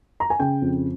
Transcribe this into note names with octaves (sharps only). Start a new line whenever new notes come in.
A#5
G#5
C#3 G5
F2